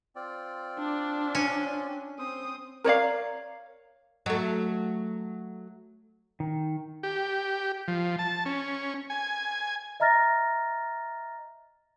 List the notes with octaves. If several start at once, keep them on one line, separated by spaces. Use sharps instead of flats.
C4 F4 D5
D4
C#4
C4 C5 D#6
A#4 C#5 D5 F5
F#3 A3
D#3
G4
F3
A5
C#4
G#5
D#5 E5 A#5 F6 A6 A#6